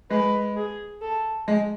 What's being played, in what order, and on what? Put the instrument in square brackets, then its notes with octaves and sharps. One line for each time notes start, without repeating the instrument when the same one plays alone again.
[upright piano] G#3 [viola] B4
[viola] G#4
A4
[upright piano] G#3